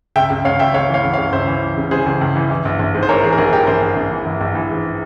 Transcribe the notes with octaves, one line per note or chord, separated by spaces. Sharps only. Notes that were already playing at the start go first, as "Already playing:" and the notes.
C#2 E5 G5
C#2
C#2 C#5 F5
C#2 E5 G5
C#2 C#5 F5
E3
C#5 F5
C#2
C#5 F5
C#2
C#2 C5 E5
E3
E3
C#3
E3 G#4 C5
C#2
C#2
E3
E3
A#1
A#1
G#2
C5
E3 A#4 C#5
G#2 G#4
A#4
A#1 G#4
E3 G4 A#4
A#1 G#4 C5
A#1
A#1
E3
A#1
A#1
E3
G#2